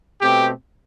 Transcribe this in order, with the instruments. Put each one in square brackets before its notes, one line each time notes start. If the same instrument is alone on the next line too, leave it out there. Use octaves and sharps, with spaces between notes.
[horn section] B2 A3 C4 G4